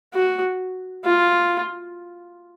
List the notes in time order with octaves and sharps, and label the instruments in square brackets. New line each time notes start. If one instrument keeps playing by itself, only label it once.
[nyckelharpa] F#4
F4